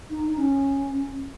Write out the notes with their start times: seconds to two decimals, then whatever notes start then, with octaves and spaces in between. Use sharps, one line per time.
0.10 D#4
0.29 D#4
0.38 C#4